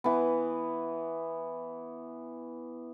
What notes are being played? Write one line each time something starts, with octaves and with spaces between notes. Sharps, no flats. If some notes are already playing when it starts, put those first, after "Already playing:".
E3 B3